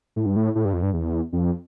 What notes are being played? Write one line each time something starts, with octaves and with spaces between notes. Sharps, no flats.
A2
G2
A2
A2
G2
F2
G2
E2
F2